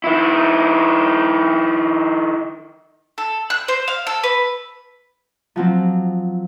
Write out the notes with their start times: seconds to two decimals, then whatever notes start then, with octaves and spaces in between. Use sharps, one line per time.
0.04 D#3 E4
3.18 A4
3.50 F#6
3.68 C5
3.88 F5
4.07 A4
4.24 B4
5.56 F3 F#3 C4